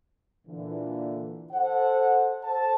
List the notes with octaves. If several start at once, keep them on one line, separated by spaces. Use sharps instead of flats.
A#2 D3 E3
A4 C5 F#5
A4 C5 A5